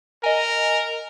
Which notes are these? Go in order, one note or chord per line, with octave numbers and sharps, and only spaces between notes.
A#4 D#5 G#5